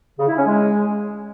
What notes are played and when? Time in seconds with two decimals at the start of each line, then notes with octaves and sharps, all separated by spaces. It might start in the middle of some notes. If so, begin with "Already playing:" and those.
0.19 C#3
0.28 E4
0.37 C#4
0.47 G#3